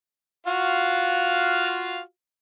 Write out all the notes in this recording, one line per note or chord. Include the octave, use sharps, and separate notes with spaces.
F4 F#4 F5